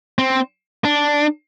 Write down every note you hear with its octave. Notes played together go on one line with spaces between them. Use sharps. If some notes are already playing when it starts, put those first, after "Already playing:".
C4
D4